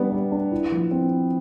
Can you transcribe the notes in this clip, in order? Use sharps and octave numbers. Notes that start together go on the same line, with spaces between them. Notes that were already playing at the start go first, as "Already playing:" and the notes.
Already playing: G3 B3 D4
G3
D4
E4
F3
C4